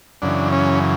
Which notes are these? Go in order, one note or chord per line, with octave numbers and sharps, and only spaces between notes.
F#2 C#3 E3 D4
C#4